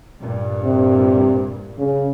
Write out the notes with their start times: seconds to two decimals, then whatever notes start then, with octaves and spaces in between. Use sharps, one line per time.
0.19 G2 A#2
0.65 C3
1.78 C#3